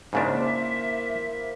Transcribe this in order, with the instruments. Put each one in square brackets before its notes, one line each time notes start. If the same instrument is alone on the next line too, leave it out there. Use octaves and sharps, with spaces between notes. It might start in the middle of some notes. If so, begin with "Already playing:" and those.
[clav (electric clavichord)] G#2 C#3 D4 [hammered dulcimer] A#3 E4 C5 [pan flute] E5